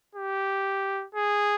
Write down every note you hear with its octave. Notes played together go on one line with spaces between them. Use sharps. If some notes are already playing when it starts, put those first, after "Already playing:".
G4
G#4